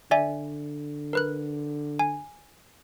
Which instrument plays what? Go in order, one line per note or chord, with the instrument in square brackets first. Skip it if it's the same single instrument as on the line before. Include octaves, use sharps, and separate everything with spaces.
[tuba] D3 [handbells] D5 E5 G#5
[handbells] A#4 B4 F#6
G#5